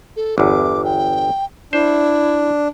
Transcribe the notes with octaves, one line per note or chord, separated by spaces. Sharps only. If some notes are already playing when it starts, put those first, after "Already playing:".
A4
G1 E2 D6
G5
D4 E4 C5